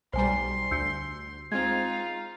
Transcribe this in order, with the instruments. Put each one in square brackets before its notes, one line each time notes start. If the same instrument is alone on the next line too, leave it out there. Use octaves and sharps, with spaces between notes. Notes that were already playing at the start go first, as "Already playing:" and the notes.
[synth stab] B1 G3 [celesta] C5 G#5 A#5 [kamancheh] C6
[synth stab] D2 [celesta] E6 G6 C#7
[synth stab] G#3 C4 [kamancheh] D#4 F4 [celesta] G#6